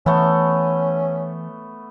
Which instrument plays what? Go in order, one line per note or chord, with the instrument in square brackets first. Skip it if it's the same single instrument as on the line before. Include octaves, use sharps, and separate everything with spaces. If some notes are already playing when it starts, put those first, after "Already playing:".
[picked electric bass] E3 [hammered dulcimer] A3 B3 [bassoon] C#4